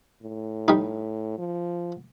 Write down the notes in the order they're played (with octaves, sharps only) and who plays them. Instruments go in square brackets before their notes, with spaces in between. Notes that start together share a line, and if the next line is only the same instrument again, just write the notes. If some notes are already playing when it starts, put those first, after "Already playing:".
[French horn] A2
[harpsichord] G3 D#4
[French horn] F3